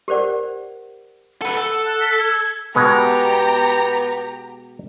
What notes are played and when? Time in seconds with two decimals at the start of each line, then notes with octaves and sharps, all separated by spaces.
0.08 G4 A#4 C5 D5 F#5
1.42 A4 B4 F#5
1.57 A4
1.85 F#6
2.01 B6
2.19 G#6
2.75 B2 G#3 B3 G4 A#5